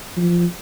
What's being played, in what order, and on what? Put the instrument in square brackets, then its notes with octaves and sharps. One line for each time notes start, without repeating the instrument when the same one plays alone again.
[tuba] F3